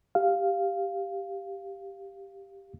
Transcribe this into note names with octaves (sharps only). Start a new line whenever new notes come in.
G4 F5